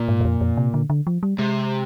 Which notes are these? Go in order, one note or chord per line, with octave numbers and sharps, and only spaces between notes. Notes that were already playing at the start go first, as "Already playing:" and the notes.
Already playing: A#2
G#2
G2
F2
F2
C3
D3
D3
F3
G3
C3 G#3